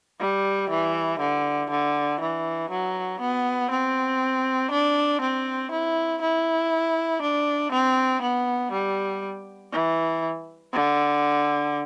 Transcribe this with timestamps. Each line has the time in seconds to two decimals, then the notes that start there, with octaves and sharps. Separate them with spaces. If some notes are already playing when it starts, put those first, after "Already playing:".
0.20 G3
0.70 E3
1.20 D3
1.70 D3
2.21 E3
2.70 F#3
3.21 B3
3.71 C4
4.71 D4
5.21 C4
5.71 E4
6.22 E4
7.22 D4
7.72 C4
8.22 B3
8.72 G3
9.73 E3
10.73 D3